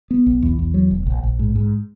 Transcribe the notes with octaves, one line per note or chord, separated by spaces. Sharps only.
B3
B1
E2
E2
F#3
E1
A#1
A#1
G#2
G#2